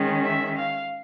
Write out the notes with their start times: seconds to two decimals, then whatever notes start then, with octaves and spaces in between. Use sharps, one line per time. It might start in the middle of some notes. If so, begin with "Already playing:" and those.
Already playing: D#3 G#3 C#4
0.24 E5
0.57 F5